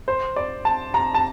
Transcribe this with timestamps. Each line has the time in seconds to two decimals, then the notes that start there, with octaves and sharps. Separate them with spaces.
0.08 C5
0.36 D5
0.65 A5
0.94 A#5
1.14 A5